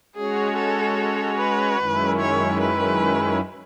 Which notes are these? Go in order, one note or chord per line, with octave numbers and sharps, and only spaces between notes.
G#3 C#4 F#4 G#4 C#5
A4
B4
F#2 D#3 G#3 C#4 E4
C#5
B4